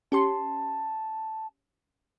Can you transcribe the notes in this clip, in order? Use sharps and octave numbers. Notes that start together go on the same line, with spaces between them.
C#4 G4 A5 C6